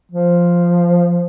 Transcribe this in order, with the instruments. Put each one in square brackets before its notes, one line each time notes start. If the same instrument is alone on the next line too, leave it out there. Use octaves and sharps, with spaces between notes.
[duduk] F3